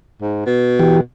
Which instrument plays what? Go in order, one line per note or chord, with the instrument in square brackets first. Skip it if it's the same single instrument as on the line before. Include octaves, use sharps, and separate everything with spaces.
[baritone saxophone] G#2
B2
[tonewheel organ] E3 G4